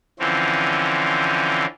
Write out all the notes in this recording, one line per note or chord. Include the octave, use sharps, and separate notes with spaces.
D3 E3 F3 C4 C#4